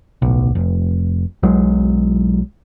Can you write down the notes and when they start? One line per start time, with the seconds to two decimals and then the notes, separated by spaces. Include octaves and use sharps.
0.22 D1 B1
0.55 F1
1.43 B1 F#3 G#3